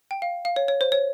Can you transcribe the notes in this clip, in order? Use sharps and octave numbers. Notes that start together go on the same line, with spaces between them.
G5
F5
F5
C#5
C#5
C5
C#5